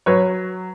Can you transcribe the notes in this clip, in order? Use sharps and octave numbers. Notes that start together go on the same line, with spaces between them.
F#3 B4 C#5